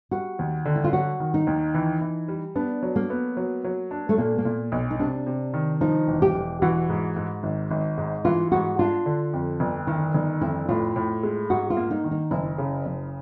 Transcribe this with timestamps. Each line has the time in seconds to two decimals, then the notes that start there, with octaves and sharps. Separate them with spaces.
0.11 G3 F#4
0.39 D#2
0.65 D3
0.76 E4
0.84 F4
0.92 F#3 F#4
1.20 D#3
1.34 D#4
1.47 D#2
1.74 E3
2.01 E3
2.28 G3
2.56 B3 D4
2.83 F#3
2.96 A#3
3.10 B3
3.37 F#3
3.64 F#3
3.91 D4
4.09 A3
4.18 A#2 A#3
4.38 A#3
4.45 A#2
4.72 B1
4.90 D#4
4.99 C3 D4
5.27 C3
5.54 D#3
5.81 F3 D#4
6.07 E1
6.22 G4
6.34 E1
6.62 E3 F#4
6.90 G#2
7.17 G#2
7.43 G#1
7.71 G#1
7.98 G#2
8.25 E3 F4
8.52 G#2 F#4
8.79 D4 F4
9.06 D3
9.33 F2
9.60 G1
9.87 D#3 E4
10.14 G1 D#4
10.41 F2 E4
10.69 A2 F4
10.96 A2
11.23 G#3
11.50 G#2 F#4
11.70 F4
11.77 A#3
11.91 D#4
12.04 D#3
12.11 D#4
12.31 F#1 E4
12.58 C#3
12.86 F#1